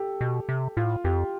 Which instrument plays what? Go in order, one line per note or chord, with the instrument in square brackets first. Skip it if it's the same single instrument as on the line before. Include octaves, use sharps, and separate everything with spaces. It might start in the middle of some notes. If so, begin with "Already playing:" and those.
Already playing: [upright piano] G4 A4
[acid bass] B2
C3
[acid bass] A2 [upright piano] F4
[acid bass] F2 [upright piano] G4